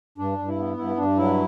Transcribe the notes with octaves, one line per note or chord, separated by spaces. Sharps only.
G2 D4
G2
E4
B3
G2 E4
G2 D4
F#3 E4